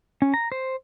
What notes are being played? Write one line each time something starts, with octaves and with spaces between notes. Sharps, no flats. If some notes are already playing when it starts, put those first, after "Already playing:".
C#4
A#5
C5